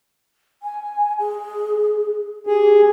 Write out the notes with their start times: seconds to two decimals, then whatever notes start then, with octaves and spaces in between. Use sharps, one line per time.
0.63 G#5
1.19 G#4
2.47 G4 G#4